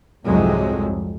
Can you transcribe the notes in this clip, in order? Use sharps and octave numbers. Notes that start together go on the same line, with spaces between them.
C2 F2 G#2 C3 F#3 G#3